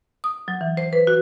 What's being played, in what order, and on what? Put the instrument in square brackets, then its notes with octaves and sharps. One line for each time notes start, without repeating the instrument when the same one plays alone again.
[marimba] D#6
F#3
E3
C5
B4
F#4